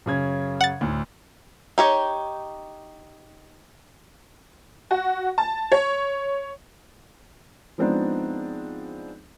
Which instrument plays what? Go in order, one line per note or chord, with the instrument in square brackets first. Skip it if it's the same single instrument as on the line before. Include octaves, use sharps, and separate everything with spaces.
[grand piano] F#2 C#3 G#6
[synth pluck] F#5 A6
[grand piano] D2 A2
[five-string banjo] D#4 G4 C#5
[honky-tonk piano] F#4
A5
C#5
[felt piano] F3 G#3 B3 C4 D4 D#4